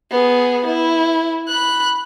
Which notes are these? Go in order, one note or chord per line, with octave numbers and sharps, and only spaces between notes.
B3 G#4
E4
B5 F#6